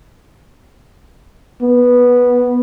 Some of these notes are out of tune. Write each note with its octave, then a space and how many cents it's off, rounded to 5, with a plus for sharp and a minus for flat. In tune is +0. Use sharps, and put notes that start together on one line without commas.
B3 -10